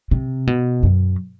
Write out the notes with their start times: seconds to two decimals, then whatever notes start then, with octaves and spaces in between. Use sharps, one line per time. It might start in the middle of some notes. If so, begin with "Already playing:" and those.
0.11 C3
0.47 B2
0.83 F#2